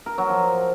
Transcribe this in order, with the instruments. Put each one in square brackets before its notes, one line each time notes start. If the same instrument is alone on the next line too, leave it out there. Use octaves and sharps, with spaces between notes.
[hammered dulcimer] A#4
F#3
F3